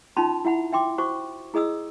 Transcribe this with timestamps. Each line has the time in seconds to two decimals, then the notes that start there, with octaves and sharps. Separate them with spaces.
0.17 C#4 D#4 F4 A5 B5 C6
0.45 E4 E5 F#5 B5
0.73 E5 G5 C6 D6
0.98 F#4 C5 C#6 D6
1.54 E4 G#4 D#5 D#6 E6